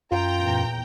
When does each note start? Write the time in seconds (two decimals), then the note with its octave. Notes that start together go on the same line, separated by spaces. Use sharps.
0.12 F#2 F4 G5 A#5
0.40 E2 A#2